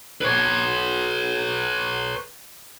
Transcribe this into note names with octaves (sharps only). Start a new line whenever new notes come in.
B4 C#5